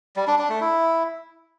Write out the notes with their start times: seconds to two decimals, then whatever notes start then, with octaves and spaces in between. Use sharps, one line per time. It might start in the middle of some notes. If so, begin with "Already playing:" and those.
0.16 G3
0.27 D4
0.38 D4
0.50 A3
0.61 E4